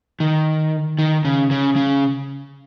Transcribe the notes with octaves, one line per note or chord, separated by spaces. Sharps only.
D#3
D#3
C#3
C#3
C#3